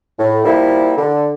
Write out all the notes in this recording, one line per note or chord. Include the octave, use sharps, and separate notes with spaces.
A2
F3 G3 A#3 E4
D3